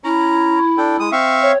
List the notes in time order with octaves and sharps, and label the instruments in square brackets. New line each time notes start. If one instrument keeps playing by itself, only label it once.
[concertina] C#4 A#5 [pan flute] E4
[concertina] D4 A4 G5
[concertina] G#3 [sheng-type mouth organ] D#6
[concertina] C4 [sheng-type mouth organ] E5 F5 C#6
[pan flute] C#5